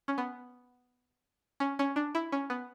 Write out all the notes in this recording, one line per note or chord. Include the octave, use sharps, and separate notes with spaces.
C#4
B3
C#4
C#4
D4
E4
C#4
B3